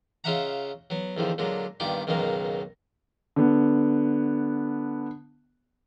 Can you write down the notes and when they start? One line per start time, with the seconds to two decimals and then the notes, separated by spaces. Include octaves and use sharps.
0.24 C#3 F4 D#5 E5 F#5 A#5
0.90 F#3 B3
1.17 E2 D3 D#3 F3
1.38 A#2 D3 F#3 G#3
1.80 G2 A#2 D#3 B3 D5 G5
2.07 C#2 F#2 B2 D#3 G#3 A#3
3.36 D3 B3